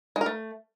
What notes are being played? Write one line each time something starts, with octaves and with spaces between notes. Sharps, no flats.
G#3
A#4
A3